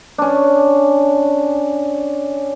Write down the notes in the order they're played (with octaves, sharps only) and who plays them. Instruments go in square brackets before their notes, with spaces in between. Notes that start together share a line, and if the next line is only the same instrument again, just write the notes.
[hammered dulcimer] C#4 D4